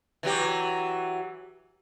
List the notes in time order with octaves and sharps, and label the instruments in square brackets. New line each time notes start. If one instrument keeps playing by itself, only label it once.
[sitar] E3 F#3 G4